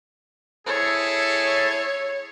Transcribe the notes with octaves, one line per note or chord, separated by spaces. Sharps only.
E4 G#4 A4 C#5